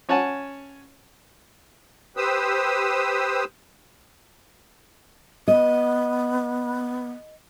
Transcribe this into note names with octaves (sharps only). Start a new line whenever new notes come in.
C#4 C#5 F#5 G#5 A5
G4 B4 C5 D#6 E6
B3 D#5